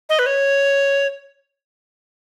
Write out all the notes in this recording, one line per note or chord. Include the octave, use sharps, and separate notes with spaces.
D#5
B4
C#5